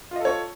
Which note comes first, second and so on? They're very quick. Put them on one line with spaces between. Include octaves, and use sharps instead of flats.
F4 D#5 A4 C#5